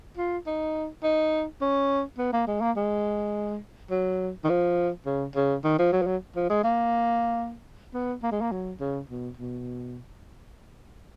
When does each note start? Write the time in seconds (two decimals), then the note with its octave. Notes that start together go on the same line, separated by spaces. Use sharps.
0.17 F4
0.47 D#4
1.03 D#4
1.62 C#4
2.18 B3
2.33 A#3
2.48 G#3
2.61 A#3
2.76 G#3
3.91 F#3
4.44 D#3
4.49 F3
5.06 C#3
5.36 C#3
5.64 D#3
5.79 F3
5.93 F#3
6.02 F3
6.06 F#3
6.36 F3
6.50 G#3
6.64 A#3
7.94 B3
8.23 A#3
8.32 G#3
8.42 A#3
8.52 F#3
8.80 C#3
9.09 B2
9.37 B2